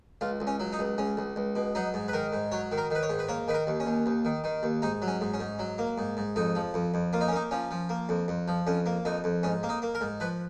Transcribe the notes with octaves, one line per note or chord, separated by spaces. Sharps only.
C#2 F4
C#2
C#4
F#3
D#4
C#2
C#2 C#4
C#2
C#2
B2
F#3 D#4
G#2
B4
D#3 A#4
G#2
F#3 C#5
D#3
A#4
D#3 B4
C#5
G#2
B4
A#3 C#5
D#3 B4
A#4
D#2
C#4
D#2
D#2
D#3
D#3
D#2
G#2 D#4
F#3
C#4
G#2
C#4
G#2
F#3
A#3
G#2
G#2
F2 D#4
F3
F2
F2
A#3 F4
D#4
C#4
A#3 D#4
F3 C#4
F3
A#3
F2
F2
F3
F2 C#4
A#3
F2 D#4
F2
G#2 C#4
A#3
D#4
A#3
A#4
G#2
F3 B4